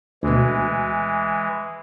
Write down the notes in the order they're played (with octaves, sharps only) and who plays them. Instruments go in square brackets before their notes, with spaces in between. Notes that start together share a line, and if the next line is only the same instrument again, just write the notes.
[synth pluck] D2 B2 [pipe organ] E3 G#3